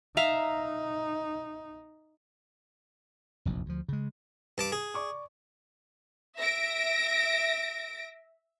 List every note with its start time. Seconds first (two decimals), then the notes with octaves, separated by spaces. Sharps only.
0.17 D#4 E5 F5 A#5
3.45 F1 A#1 E2
3.66 D2 F3
3.89 C#3 G#3
4.58 G2 A5 D6
4.72 G#4
4.94 D5 C#6 D6
6.39 E5 A#6 D7